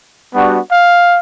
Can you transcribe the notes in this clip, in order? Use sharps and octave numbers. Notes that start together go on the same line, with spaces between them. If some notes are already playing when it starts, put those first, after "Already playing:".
G3 B3 D4 F#4
F5